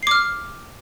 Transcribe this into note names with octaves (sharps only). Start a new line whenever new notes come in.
D6 F6 C7